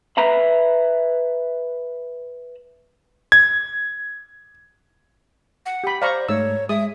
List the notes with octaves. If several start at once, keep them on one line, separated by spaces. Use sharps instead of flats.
B4 E5 A#5 B5
G#6
F#5
G4 B5
C5 D5 F5 A#5 C#6
G#2 A3 C#5 E6
G#3 E5 D#6